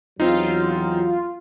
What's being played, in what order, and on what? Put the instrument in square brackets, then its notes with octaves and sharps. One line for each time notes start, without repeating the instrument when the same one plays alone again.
[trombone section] E2 F#3 [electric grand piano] C4 D#4 [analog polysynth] F4